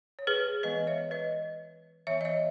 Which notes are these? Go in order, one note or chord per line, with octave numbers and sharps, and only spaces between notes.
C#5
G#4 B4
E3 G#3 B3 B4 D#5
C#5 E5
B4 D#5
E3 B3 C#5 E5
D#5
C#5 E5